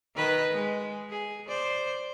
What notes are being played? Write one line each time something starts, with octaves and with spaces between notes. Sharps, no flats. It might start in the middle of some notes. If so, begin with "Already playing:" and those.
D#3 B4 D#5
G#3
G#4
C5 D5